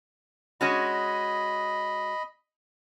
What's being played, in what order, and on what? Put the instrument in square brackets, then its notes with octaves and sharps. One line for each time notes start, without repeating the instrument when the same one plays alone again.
[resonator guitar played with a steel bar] G#3 C#4 F#4 [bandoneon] D#5 B5